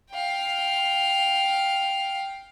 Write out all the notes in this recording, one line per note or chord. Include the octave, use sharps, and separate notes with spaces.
F5 G5